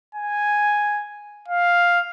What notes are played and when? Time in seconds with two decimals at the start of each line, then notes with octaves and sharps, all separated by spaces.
0.15 G#5
1.48 F5